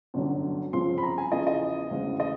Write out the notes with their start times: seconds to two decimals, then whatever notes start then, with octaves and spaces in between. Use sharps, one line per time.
0.14 G1 F#2 D3 F#3
0.73 G1 F2 C#3 F3 C6
0.98 B5
1.03 A#5
1.18 G#5
1.32 E2 C#3 F3 D#5
1.47 D#5
1.91 E1 D2 C#3 E3
2.20 D#5